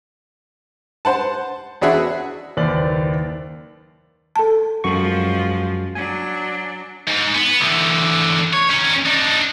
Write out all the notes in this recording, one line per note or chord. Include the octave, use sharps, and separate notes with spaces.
C5 F#5 A5
E2 D4 F#4 G#4 E5 F#5
F#1 D#2 B4 C5 D5 F#7
A4 A5
F#2 F3 G#3 F#4 C#6
F#3 D4 G#5
G#2
B3
E2 D3
C#5
D#3 C#4
D4 D#4